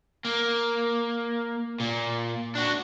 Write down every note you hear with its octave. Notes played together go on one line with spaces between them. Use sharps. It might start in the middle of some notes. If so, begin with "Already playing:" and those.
A#3
A#2
D4 F#4